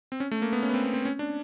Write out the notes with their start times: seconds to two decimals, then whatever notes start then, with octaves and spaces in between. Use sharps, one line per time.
0.12 C4
0.20 C#4
0.31 A3
0.42 A#3
0.53 B3
0.63 C#4
0.69 B3
0.74 C4
0.84 B3
0.94 C4
1.05 C#4
1.19 D4